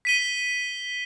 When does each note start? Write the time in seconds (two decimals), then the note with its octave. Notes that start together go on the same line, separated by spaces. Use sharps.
0.05 B6 D#7 G7